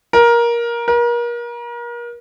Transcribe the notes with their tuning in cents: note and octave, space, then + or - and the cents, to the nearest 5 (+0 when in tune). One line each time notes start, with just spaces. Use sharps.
A#4 +15
A#4 +35